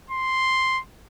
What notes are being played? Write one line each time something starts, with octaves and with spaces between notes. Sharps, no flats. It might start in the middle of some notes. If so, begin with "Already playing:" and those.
C6